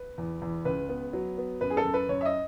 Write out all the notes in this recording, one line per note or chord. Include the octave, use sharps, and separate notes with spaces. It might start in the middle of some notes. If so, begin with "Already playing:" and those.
Already playing: B4
E2
E2
C#2 B4
B3
F#3
B3
F#2 B4
G#4
A4
F#2
B4
F#2 C#5
E5
D#5